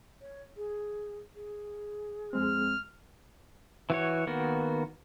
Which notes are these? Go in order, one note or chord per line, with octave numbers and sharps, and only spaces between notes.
C#5
G#4
G#4
F2 G#3 C4 F6
E3 F#4 C#5
D#3 A#3 B3 F#4